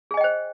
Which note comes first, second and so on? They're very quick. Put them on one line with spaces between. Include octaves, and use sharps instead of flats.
G#4 G#5 D#5 G5 C5